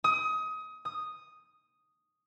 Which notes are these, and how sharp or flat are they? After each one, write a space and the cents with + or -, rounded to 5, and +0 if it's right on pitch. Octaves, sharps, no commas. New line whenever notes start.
D#6 +25
D#6 +0